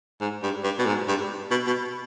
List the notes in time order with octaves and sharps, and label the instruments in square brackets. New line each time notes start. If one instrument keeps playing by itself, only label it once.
[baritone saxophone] G#2
G2
G2
B2
G#2
G2
B2
B2